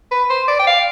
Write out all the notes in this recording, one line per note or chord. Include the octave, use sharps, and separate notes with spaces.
B4
C5
D5
G5
F5